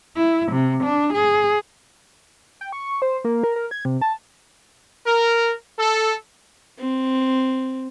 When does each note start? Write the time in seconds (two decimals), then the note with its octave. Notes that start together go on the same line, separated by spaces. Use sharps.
0.16 E4
0.52 C3
0.84 D4
1.13 G#4
2.61 G5
2.72 C#6
3.02 C5
3.24 A#3
3.44 A#4
3.56 A#4
3.71 G#6
3.85 C3
4.01 A5
5.06 A#4
5.79 A4
6.79 C4